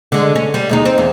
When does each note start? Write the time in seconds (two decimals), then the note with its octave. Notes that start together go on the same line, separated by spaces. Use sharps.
0.12 D3 G#3
0.36 C#4
0.54 G3
0.69 D#2 G#3 D#4
0.85 C4
0.98 E2